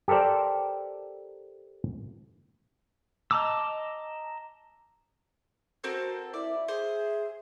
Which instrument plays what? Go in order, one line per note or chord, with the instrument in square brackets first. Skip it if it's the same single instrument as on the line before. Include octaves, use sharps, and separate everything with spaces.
[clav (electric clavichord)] G4 A4 A#4 C5 D5
[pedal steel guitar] D#5 A5 A#5 D6 E6
[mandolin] C4 A4 A#4 [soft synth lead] F#4 [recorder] C5
[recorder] E4 [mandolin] D5 [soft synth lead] E5
[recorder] G#4 [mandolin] C5